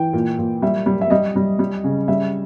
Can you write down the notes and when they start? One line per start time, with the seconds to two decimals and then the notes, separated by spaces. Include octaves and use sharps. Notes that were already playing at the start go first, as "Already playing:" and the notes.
Already playing: E3 G5
0.13 A#2
0.39 A#2
0.62 G3 E5
0.86 G3
1.01 E5
1.10 G3 D#5
1.36 G3
1.59 G3
1.84 C#3
2.08 G3 E5